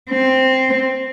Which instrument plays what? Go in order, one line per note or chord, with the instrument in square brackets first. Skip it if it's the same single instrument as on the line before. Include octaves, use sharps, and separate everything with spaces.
[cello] C4